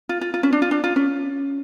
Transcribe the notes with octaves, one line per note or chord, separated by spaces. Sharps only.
F4
F4
F4
C#4
D4
F4
D4
F4
C#4